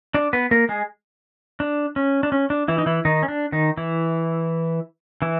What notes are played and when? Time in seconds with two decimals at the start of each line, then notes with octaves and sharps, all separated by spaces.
0.14 D4 D5
0.33 B3 B4
0.51 A#3 A#4
0.69 G#3 G#4
1.60 D4
1.96 C#4
2.23 D4
2.32 C#4
2.50 D4
2.68 E3 E4
2.78 D#4
2.86 E3 E4
3.05 D#3 D#4
3.23 C#4
3.28 D4
3.52 D#3 D#4
3.77 E3 E4
5.22 E3 E4